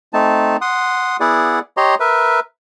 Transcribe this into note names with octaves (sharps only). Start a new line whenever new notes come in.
A3 C4 D#4 A5
F#5 C6 D#6
B3 E4 G#4 D5 F#5
G4 C#5 D#5 A#5 C6
A#4 B4 E5